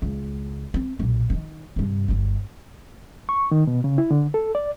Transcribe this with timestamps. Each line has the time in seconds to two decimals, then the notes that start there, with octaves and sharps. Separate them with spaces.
0.02 C#2
0.74 C4
0.99 B1 A#2
1.30 D#3 E3
1.76 G2 C3
2.08 G1 D2
3.29 C#6
3.51 D#3
3.67 B2
3.84 C#3
3.98 E4
4.11 D3
4.34 A4
4.55 D5